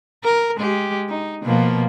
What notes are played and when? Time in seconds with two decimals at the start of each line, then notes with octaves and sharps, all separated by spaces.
0.24 A#4
0.57 G#3 G4
1.09 D#4
1.43 B2 F3 A#3